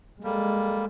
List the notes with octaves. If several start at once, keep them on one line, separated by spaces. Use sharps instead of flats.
G3 G#3 A#3 A4